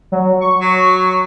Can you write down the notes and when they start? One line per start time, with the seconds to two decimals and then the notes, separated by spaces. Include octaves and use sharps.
0.12 F#3
0.41 C#6
0.61 F#3